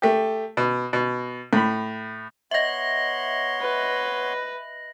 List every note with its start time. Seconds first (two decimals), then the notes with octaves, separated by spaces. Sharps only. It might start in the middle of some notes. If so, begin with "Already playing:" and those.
0.02 A3 G4
0.57 B2
0.93 B2
1.53 A2 B5
2.51 B3 C#5 D#5 E5 C6 A#6 F#7
3.62 B4